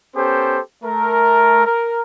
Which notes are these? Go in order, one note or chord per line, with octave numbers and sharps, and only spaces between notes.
B3 C#4 G4 A4 C5
A3 A#4
A#4